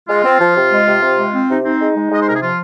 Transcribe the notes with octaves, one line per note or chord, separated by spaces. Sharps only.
G#3 F4
C4
F3
C3
G#3
C3
C3
G#3
C4
C3 D#4
C4 D#4
G#3
G#3
G#3 D#5
C5
C3 A#4
G#4
F3 F4